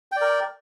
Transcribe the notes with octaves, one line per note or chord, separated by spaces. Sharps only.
A#4 D5 G5